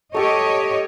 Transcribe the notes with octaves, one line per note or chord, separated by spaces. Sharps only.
A3 G4 A4 C#5 D#5